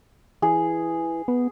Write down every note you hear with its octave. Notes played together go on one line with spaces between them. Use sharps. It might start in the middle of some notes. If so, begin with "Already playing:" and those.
E3 G#4
B3